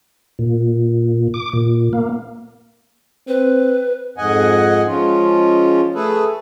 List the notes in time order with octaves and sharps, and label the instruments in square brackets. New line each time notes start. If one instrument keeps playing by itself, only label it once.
[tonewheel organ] A#2
D6
A#2
A#3
[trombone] C4 [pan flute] B4
[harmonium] F2 G#2 D#5 F#5 G#5
F3 G#3 C#4 F4
A3 G#4 A4 B4